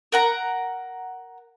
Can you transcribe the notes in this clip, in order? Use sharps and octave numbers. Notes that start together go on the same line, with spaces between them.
A#4 F#5 A#5